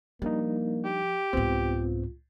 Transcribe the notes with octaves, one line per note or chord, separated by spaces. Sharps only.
F3 G3 A#3 D4 D#4
G4
C2 G#2 B3 C4 F4